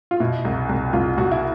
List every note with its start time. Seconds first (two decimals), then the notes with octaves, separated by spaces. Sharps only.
0.11 F4
0.20 B2 E4
0.45 C2
0.69 C2
0.93 C2 F4
1.17 C2 F#4
1.32 E4